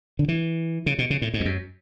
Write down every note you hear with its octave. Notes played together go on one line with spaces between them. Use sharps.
D3
E3
C#3
B2
C#3
A2
G#2
E2
F#2